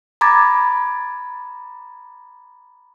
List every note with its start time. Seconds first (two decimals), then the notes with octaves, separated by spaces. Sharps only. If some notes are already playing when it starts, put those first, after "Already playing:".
0.21 A#5 B5 D6 G#6 A6